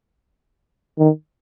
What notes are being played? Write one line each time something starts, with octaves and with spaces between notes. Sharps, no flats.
D#3